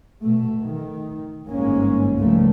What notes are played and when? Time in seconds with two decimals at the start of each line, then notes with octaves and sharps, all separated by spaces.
0.22 B2 A3
0.61 D#3
1.48 G1 G#2 G#3 A#3 C#4
2.17 C#2 F3 G3 A3 A#3